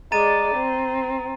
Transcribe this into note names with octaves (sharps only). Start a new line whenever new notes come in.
G#3 D5 A#5 A6 D#7
C4